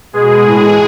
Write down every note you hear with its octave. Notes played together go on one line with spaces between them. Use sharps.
B2 G#3 G#4
A2 E3